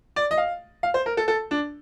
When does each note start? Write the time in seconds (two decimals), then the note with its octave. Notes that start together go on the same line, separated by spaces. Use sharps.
0.16 D5
0.31 D#5
0.38 F5
0.83 F5
0.94 C5
1.06 A#4
1.17 A4
1.28 A4
1.51 D4